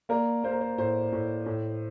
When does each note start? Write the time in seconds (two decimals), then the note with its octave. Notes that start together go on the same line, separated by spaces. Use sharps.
0.09 A#3 A#4 D5
0.43 A#3 C5
0.51 A#4
0.61 C5
0.78 A2 C5
1.12 A2
1.46 A2